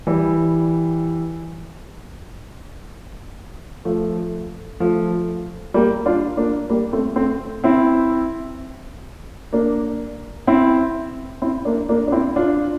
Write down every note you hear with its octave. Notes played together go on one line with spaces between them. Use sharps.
E3 G3
F3 A3
F3 A3
G3 A#3
D4 F4
A#3 D4
G3 A#3
A3 C4
A3 C4
C4 E4
A#3 D4
C4 E4
C4 E4
A#3 D4
A#3 D4
D4
C4 E4
D4 F4